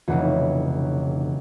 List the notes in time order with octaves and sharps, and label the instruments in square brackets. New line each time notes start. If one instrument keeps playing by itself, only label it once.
[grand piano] F1 F#5 [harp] B1 C#3 E3